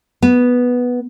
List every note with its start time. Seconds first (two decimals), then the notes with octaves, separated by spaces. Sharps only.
0.22 B3